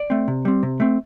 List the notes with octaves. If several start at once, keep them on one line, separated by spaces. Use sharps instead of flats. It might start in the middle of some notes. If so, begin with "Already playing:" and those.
Already playing: D5
A3 C4
C3
G3 C4
C3
A3 C4